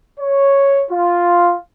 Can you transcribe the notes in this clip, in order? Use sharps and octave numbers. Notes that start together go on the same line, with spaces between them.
C#5
F4